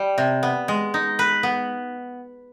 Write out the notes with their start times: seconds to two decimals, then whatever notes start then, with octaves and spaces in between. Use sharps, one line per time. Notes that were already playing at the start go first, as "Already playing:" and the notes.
Already playing: G3
0.18 C3
0.43 B3
0.68 G#3
0.94 D#4
1.19 B4
1.43 B3